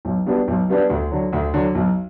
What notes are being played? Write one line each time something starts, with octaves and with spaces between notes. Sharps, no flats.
B1
B2 G3 B3 D4
B1
B2 G3 B3 D4
D2
D3 F#3
D2
D3 F#3
B1